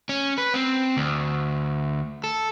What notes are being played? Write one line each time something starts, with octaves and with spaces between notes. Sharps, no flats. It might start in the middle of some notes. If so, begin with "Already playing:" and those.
C#4
B4
C4
D2
A4